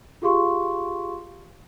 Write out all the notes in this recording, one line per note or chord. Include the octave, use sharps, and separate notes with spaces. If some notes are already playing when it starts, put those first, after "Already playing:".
F4 G4 G#4 F5 C6 C#6